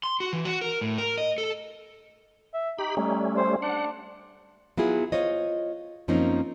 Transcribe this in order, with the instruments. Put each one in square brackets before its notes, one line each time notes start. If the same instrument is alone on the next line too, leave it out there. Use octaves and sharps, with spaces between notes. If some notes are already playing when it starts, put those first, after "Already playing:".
[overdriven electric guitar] C6
F#4
E3
F#4
A#4
A2
A#4
D#5
A4
[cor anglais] E5
[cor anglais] D#4 [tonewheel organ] G4 B5
[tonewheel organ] G3 A3 C#4
[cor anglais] C5
[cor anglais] D4 [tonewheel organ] F#5
[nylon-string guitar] F#3 B3 E4 F4 G#4
F4 C5 C#5 D#5
F#2 F3 A#3 C4 C#4 D#4